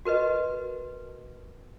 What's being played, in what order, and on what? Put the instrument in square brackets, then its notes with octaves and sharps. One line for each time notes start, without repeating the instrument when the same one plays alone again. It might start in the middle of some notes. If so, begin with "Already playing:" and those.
[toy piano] F#4 A#4 B4 D#5